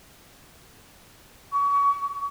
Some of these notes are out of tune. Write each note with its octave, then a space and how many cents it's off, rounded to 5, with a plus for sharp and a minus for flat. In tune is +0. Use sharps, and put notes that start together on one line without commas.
C#6 +35